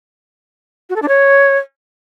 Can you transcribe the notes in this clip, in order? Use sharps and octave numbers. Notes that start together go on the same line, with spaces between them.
F#4
A4
D4
C#5